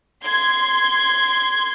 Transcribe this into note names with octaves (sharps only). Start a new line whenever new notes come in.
C6 G#6